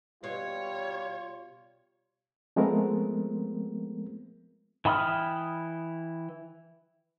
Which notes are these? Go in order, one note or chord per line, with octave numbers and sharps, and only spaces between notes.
B2 G3 F4 C#5
F3 G#3 A3 B3 C4 A#4
E3 G5 B5 D#6 F6